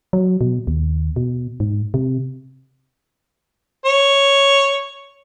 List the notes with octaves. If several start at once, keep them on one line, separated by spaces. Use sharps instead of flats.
F#3
B2
D#2
B2
G#2
C3
C#5